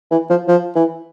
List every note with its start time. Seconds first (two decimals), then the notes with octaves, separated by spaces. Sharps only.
0.11 E3
0.30 F3
0.48 F3
0.75 E3